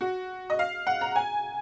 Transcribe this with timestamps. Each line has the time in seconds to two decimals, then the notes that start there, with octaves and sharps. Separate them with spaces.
0.01 F#4
0.50 D#5
0.59 F5
0.87 F#5
1.01 A#5
1.16 G#5